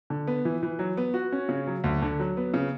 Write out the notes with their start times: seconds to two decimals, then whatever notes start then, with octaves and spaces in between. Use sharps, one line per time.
0.10 D3
0.27 B3
0.45 E3
0.63 E3
0.79 F#3
0.97 B3
1.14 F#4
1.32 C#4
1.49 C#3
1.67 F#3
1.84 D2
2.02 D3
2.20 F#3
2.37 B3
2.54 C#3